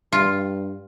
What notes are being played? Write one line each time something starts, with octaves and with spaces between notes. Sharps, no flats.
G2 F4